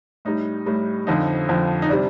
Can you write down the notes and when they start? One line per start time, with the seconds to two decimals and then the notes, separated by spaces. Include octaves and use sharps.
0.25 A2 G3 D#4
0.66 A2 G3
1.07 F2 D3 F3 D#4
1.49 F2 D3 F3
1.82 D#4
1.89 C3 G3 D4